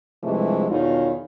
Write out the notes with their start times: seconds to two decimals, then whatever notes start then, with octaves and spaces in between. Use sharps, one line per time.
0.24 G2 C3 E3 F3 G#3 A3
0.69 E2 B2 D#3 D#4 F4 C#5